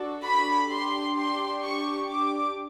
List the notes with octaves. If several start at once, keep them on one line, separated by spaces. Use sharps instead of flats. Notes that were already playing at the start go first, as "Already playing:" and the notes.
Already playing: D4 F#4 A4
B5
D4 G4 C6
C6
C#6
D6